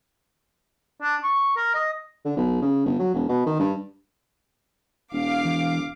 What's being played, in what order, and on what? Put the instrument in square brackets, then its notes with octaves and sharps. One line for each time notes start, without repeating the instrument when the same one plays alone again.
[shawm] D4
C#6
A#4
D#5
[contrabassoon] D3
B1
C#3
G1
F#3
E1
B2
D#3
G2
[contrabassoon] E1 [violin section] F5 D6
[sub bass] E3